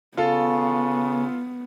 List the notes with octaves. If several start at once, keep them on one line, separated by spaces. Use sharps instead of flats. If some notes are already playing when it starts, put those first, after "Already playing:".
C#3 B3 F4 A4 F5